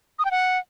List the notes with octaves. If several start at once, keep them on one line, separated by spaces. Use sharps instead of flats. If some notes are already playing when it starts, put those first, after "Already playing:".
D#6
G5
F#5